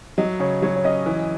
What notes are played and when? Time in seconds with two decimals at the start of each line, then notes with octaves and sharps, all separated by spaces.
0.18 F#3 D#5
0.40 C#3 C#5
0.62 F#3 C#5
0.76 C#5
0.84 C#4 D#5
1.06 E3